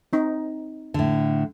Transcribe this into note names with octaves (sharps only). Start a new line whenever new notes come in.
C4 D#4
A2 D3